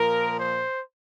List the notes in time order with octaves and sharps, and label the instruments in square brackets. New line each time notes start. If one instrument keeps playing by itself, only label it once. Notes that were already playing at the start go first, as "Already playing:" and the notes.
Already playing: [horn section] A#2 F3 A#4
C5